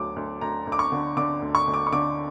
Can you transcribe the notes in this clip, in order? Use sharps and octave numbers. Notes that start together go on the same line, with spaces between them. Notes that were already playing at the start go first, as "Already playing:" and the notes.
Already playing: D2 F#3 D6
D2
D2 A#5
D2
D6
C#6
D3
D3 D6
D2
C#6
D2
D6
C#6
D3 D6